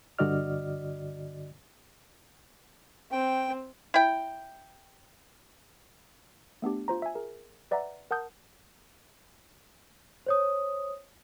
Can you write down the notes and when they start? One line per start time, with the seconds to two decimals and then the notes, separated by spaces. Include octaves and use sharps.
0.19 G2 D3 F#4 D5 D#5 F6
3.12 C4 G5
3.94 E4 G5
6.62 A3 B3 D4 G4
6.88 F4 C5 A#5
7.02 E5 G#5
7.15 G#4 A#4
7.71 B4 D5 E5 F#5 A#5
8.11 A#4 F#5 A5 D#6 G6
10.26 C5 C#5 D#6